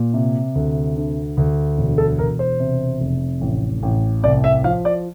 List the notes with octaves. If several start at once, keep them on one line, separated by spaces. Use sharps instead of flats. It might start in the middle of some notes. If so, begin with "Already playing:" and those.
Already playing: A#2
C3
D2
D3
D2
E1
A4
E1 A#4
C5
C3
F1
A1
A1
C2 D5
E5
F3 F5
D5